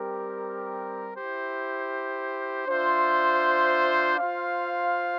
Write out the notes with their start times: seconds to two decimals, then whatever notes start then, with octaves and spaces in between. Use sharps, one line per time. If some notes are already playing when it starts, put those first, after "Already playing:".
Already playing: G3 C4 G4 A#4
1.15 E4 G4 C5
2.66 D4 F4 C5 E5
4.18 F4 C5 F5